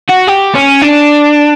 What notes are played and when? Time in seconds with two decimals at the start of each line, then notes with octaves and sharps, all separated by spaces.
0.10 F#4
0.28 G4
0.55 C#4
0.82 D4